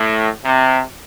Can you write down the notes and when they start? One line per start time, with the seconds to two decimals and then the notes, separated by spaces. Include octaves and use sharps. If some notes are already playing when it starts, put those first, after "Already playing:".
Already playing: A2
0.44 C3